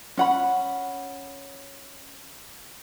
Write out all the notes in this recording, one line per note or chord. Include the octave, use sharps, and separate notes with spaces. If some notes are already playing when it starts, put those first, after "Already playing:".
C#4 F#5 B5